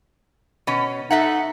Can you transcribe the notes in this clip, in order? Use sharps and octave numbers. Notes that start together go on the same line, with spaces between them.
B2 C#4
D#4 A4 E5 F#5